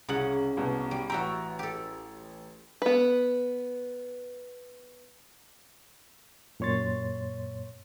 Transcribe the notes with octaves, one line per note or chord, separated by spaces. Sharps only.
C2 C#3 F#5 F#7
C2 B2
G3
A1 F#4 E5 G5 A#5
G4 A4
B3 B4
F#2 A#2 C#5 C6 A6